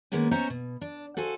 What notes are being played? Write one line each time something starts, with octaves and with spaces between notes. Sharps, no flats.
D#3 G#3 A#3 B3 C#4
B3 C#4 C5 C#5 D#5 A#5
B2
D4
F#4 A4 C5 F5 G#5